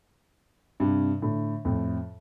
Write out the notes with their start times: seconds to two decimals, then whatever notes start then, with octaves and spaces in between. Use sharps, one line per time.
0.80 G2 C3
1.22 A2 D3
1.65 F2 A2